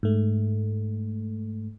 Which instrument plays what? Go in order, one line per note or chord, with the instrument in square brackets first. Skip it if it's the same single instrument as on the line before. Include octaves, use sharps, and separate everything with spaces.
[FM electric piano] G#2 A3